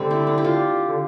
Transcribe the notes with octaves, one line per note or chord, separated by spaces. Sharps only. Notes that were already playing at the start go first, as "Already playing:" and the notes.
Already playing: D3 G3 A3 C4
E4
D4
G4
F4
D3